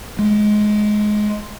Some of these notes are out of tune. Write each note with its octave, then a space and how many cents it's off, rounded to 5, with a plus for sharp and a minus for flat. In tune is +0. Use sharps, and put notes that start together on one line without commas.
G#3 +15